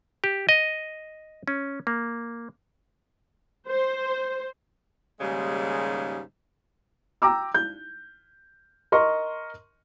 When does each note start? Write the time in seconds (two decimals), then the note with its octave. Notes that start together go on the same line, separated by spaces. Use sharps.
0.24 G4
0.49 D#5
1.48 C#4
1.87 A#3
3.68 C5
5.20 D#2 G#2 C#3 G3 G#3
7.22 G5 A#5 D6 E6
7.54 G6
8.92 A#4 D#5 C6 C#6